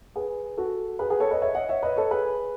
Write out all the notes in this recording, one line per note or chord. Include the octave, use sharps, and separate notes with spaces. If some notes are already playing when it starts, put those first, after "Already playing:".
G#4 B4
F#4 A4
G#4 B4
G#4 B4
A4 C#5
B4 D#5
C#5 E5
D#5 F#5
C#5 E5
B4 D#5
A4 C#5
G#4 B4